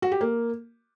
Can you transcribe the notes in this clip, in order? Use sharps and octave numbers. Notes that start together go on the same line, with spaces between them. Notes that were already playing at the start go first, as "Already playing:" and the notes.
F#4
G4
A#3